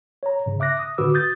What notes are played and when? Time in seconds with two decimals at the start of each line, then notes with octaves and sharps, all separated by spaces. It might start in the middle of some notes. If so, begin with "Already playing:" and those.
0.23 C#5 A#5
0.46 G#2 C#3
0.60 E5 D6 F#6 A#6
0.79 D#6
0.98 A2 D3 F#4 B4 D6 E6
1.14 D#6 G6 A6